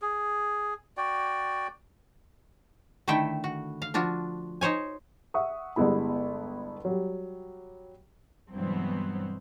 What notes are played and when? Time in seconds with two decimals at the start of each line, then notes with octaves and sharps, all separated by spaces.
0.02 G#4
0.97 F#4 D5 G5
3.08 D3 D#3 A3 E4 E5 G5
3.44 F#4
3.82 F5
3.94 F3 D4 F4 F#4
4.61 D#4 C5 C#5 G#5
5.34 E5 F#5 C#6 D#6
5.76 G1 G3 G#3 B3 E4 B5
6.85 F#3 G3
8.54 G2 B2 E3 F#3 B3 C4